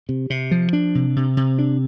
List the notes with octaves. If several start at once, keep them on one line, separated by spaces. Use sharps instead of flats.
C3
C3
F3
D4
C3
C3
C3
D4